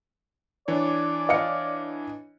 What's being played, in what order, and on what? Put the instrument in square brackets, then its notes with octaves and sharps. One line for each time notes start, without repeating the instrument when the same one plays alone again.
[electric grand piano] E3 D4 C#5 [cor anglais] D5
[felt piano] D#5 F5 C#7